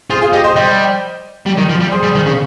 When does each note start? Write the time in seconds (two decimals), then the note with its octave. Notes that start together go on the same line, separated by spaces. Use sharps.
0.10 F4 G#4 C5
0.21 F4 G#4
0.33 D#4 G4
0.44 C5 D#5
0.56 G3 C5 D#5
1.46 G3
1.58 D#3
1.70 F3
1.81 G3
1.92 G#4 C5
2.03 G3
2.15 D#3
2.26 C#3